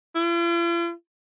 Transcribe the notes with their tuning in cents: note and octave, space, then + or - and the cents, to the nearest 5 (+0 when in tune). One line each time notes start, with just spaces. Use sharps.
F4 -45